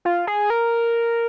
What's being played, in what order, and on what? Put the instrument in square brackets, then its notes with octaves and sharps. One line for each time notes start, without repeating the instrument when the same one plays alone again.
[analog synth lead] F4
G#4
A#4